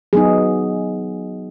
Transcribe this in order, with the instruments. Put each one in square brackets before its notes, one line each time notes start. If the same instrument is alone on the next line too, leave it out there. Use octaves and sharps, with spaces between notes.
[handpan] F#3 B3 D#4 G#4